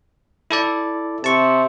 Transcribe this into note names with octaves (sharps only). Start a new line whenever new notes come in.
E4 A4 D5
C3 A5 C#6